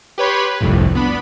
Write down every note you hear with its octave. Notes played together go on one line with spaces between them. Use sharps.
G4 B4 C#5 B5 C6
B4
G1 C2 F2 A2
B3 D4 B5